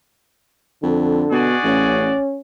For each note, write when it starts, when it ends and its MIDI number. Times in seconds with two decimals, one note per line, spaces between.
0.83 1.25 41
0.83 1.49 50
1.31 1.56 47
1.31 2.18 66
1.31 2.18 68
1.31 2.18 74
1.64 2.13 33
1.64 2.40 61